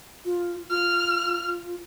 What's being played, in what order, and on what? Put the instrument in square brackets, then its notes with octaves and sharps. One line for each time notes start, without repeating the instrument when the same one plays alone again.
[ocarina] F4
[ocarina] F4 [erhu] F6